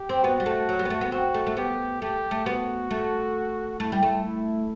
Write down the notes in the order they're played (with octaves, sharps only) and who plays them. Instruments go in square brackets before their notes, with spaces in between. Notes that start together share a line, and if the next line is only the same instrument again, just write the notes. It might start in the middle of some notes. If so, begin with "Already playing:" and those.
Already playing: [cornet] G4
[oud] C4
[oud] B3 [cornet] F#4
[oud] G3
A3
F#3
G3
B3
A3
B3
[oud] C4 [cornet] F#4
[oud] A3
A3
[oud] B3 [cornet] G4
[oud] A3 [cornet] G4
[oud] A3
[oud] B3 [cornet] F#4
[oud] A3
[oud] A3 [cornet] E4
[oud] G3
A3
[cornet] E4